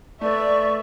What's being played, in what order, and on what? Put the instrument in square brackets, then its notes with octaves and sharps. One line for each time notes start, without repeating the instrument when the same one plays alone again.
[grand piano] A3 B4 [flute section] D5 [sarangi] E5 [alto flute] C#6